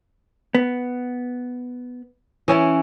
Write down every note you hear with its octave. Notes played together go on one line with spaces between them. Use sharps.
B3
E3 C#4 E4